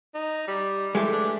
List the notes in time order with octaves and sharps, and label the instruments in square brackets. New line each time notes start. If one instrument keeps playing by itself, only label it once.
[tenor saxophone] D#4
G3
[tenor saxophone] E3 [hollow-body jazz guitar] G#3 A3 G4
[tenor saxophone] D4